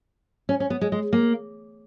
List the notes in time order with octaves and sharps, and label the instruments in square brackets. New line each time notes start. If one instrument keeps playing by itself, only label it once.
[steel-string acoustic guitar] C#4
C#4
B3
G#3
G#3
A#3